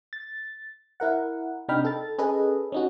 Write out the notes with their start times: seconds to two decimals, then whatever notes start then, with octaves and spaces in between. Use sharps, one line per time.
0.13 A6
1.00 E4 A#4 F#5
1.68 C3 D4 D#4 G5 B5 F6
1.85 A4 A6
2.18 C#4 G#4 A4 B4 D#5
2.72 C#4 D#4 F#4